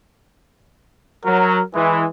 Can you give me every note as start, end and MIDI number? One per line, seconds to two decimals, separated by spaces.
1.25 1.58 54
1.25 1.63 70
1.74 2.04 52
1.74 2.07 56